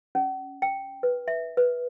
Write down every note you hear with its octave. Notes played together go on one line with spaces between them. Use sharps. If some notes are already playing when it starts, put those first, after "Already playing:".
C#4
G5
B4
E5
B4